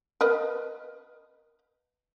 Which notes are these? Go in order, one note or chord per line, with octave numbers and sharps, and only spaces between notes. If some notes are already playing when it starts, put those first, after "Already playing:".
A#4 B4 D#5